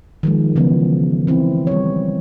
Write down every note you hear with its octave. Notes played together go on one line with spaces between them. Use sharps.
D#3 F3 G#3
C#3 E3 F3 B3
E3 C4 E4
G3 C#5